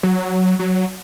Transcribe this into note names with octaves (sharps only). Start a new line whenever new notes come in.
F#3
F#3